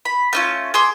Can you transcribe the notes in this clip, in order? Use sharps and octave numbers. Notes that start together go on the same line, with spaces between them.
B5
A3 C#4 F4
G#4 C6 D6